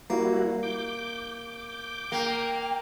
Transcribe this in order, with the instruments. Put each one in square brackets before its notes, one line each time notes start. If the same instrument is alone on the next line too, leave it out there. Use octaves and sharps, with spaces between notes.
[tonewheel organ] G3 E4 F#4 [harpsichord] A#3
[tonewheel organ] D6 G6
[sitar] A#3 [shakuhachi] G5